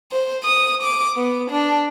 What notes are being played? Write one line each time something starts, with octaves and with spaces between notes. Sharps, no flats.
C5
D#6
D6
B3
D4